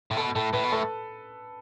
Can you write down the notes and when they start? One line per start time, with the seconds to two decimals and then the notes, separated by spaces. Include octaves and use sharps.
0.11 A2
0.17 B2 A4
0.35 A2 A4
0.53 A2 B4
0.63 B2
0.72 A2 A4